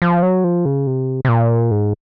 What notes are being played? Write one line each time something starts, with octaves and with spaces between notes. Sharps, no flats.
F3
F#3
F3
C#3
C3
C3
A#2
G#2